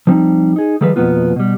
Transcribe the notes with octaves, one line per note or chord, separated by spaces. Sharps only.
F3 G3 C4 D4 D#4
D#4 G#4
D#3 F3 G3 G#3 A4 B4
F2 B2 G#3 A#3 B3 F4
B2 G3